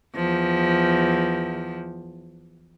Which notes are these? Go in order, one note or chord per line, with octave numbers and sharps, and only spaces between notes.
E2 F3